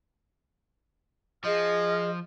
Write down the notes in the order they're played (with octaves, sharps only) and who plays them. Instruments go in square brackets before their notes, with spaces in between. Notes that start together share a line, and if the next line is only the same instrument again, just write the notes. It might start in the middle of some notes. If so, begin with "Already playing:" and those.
[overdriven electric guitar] F3 [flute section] G#4 D#5 F6